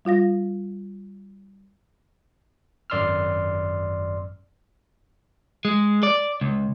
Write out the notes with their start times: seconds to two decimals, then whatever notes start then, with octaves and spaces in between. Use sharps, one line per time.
0.05 G3 F4 F5 A#6
2.90 G#1 F#2 D5 C6 E6 F6
5.65 G#3
6.03 D5
6.41 C#2